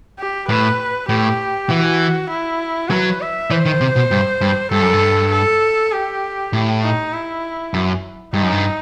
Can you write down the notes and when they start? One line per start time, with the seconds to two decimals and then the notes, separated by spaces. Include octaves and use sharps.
0.19 G4
0.49 A2 B4
1.09 A2 G4
1.70 E3 F#4
2.30 E4
2.90 F#3 B4
3.21 E5
3.50 E3 C5
3.66 D#3
3.81 C3
3.96 B2
4.11 G2
4.41 G2
4.72 G2 A4
4.82 F#2
4.93 G2
5.32 A4
5.92 G4
6.53 A2
6.83 D#4
7.13 E4
7.74 F#2
8.34 G2 D#4
8.43 F#2
8.52 G2